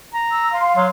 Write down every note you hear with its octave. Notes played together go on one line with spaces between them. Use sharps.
A#5
E6
F5 C6
F#3